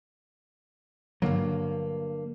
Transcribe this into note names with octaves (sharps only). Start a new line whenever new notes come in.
G2 D3 F#3 A#3